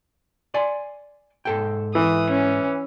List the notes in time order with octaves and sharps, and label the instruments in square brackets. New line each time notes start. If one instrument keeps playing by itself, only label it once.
[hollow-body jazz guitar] D5 G#5 C6
G#2 A4 G5
[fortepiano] E3 [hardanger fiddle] D#6
[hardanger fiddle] C#4